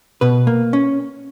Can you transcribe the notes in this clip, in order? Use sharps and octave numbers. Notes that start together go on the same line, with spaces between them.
B2 B4
A#3
C#4